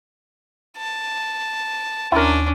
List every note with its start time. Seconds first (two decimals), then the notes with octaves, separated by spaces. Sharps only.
0.78 A5
2.12 D#2 C#4 D4 E4 A#4 C6 A6